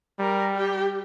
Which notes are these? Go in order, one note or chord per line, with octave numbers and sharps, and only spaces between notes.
G3 A#4
G4